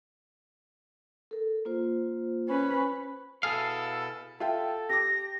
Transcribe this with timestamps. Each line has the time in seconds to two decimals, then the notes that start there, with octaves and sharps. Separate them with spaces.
1.31 A4 A#4
1.65 A#3 F4 C5
2.48 C#4 B4 C5 B5
3.43 B2 E4 G#4 A4 F5
4.40 F4 A4 E5 G5
4.90 G4 D6 A#6